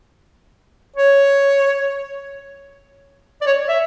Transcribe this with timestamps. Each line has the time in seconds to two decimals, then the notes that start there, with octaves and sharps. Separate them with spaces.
0.96 C#5
3.42 D5
3.47 C#5
3.69 E5